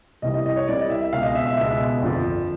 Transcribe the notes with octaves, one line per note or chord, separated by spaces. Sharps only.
C2 C3 E3 G3 D#5
D#5
D#5
C#5
C2 C3 E3 G3 D5
D#5
E5
E5
C#2 B2 G#3 F5
D#5
E5
E5
C#2 B2 G#3 E5
G1 F2 D3 F3